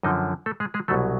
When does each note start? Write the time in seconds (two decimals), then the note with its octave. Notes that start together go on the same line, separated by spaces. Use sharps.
0.03 F#2 D3 F3 D#4 D#5
0.46 A3 A4
0.60 G#3 G#4
0.74 G#3 G#4
0.88 C2 B2 F#3 A3 A4